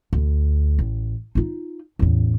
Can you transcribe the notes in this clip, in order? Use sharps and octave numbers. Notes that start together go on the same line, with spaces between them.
D2
A1
D#4 F4
A1 E2